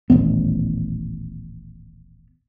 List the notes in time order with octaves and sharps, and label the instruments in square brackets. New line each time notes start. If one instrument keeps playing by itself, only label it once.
[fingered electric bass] D#1 A1 C3 B3